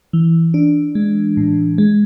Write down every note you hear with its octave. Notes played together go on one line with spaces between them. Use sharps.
E3
D4
G#3
A2
G#3